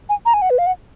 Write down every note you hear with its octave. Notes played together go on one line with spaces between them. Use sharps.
G#5
A#5
G#5
F#5
B4
F5
F#5